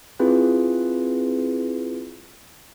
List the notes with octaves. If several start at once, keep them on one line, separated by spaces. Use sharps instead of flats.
C4 E4 F4 G#4 B4